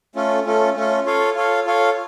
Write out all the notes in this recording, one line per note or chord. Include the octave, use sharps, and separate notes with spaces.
A3 C#4 F4 A4
A3 C#4 F4 A4
A3 C#4 F4 A4
F4 A4 C#5 F5
F4 A4 C#5 F5
F4 A4 C#5 F5